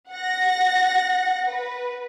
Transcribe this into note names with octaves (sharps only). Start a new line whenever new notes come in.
F#5 A#6
B4